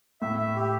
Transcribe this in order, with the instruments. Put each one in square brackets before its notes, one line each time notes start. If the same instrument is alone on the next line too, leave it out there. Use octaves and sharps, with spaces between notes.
[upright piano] A2 [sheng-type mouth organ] E5
[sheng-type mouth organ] E5
G4